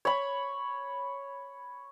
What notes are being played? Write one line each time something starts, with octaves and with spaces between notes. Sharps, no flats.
C#5 B5